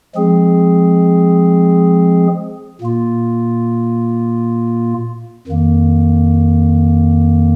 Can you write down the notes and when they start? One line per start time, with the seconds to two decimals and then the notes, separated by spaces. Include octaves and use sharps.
0.15 F3 G#3 C4 G#4
2.81 A#2 A#3 F4
5.47 F2 D#3 A#3